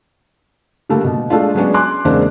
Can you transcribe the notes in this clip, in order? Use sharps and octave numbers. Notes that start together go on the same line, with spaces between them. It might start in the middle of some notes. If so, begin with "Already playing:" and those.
D3 G3 A3 A#3
B2
G#3 A3 D4 F4
F#3 G#3 B3 C#4 D4 F#4
G#5 C6 D6 F#6
E2 C#3 G#3 A#3 C4 D4